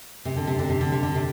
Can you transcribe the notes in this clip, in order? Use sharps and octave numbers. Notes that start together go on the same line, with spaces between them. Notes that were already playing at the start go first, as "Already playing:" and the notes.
C3
D3
C3
D3
C3
D3
C3
D3
C3